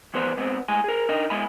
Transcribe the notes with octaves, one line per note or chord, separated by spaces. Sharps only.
E3 F3 G3 B3 B4 C5
G#2 B3 C4
A2 G#3 G#5
G#4 A#4
D4 D#4 A#4 D#5
G#3 B3 E4 G#5 B5